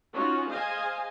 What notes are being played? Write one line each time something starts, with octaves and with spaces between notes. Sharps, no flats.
C#4 D#4 F4 F#4
G#4 C5 D#5 F5 G#5